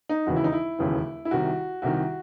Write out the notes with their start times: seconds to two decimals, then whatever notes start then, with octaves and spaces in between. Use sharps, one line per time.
0.09 D#4
0.27 E1 D#2 C#3 E3 F#4
0.36 E4
0.44 D#4
0.53 E4
0.78 E1 D#2 C#3 E3
1.25 E4
1.31 C2 C3 D#3 F#4
1.82 C2 C3 D#3 F#4